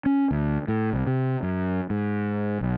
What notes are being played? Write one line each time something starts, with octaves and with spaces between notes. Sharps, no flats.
C#4
D2
A2
C2
C3
F#2
G#2
B1